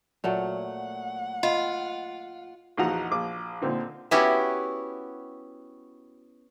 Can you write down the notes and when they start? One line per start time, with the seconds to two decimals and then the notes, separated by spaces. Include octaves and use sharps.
0.24 A#2 F#3 A3 F#5
1.43 F4 D#5 B5 C6
2.77 A#1 E2 D#4 F#4 F#5 A#5
3.11 A#1 D6
3.62 A#2 D3 C4 D#4
4.11 B3 C#4 E4 F#4 G4